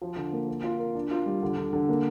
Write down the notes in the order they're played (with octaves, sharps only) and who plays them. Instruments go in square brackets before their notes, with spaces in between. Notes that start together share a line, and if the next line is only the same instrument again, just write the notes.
[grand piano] F3
D3
A#3
A#4
F4
A#4
D4
F4
G3
D3
D3
D3
A#3